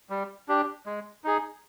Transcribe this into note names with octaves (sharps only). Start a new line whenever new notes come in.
G3
D4 G4
G#3
D#4 G#4